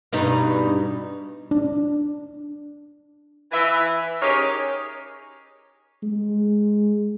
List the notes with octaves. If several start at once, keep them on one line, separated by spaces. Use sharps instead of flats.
G2 B2 D#4
D4
E3 B4 E5
C#4 D#4 G4 G#4 A#4 C#5
G#3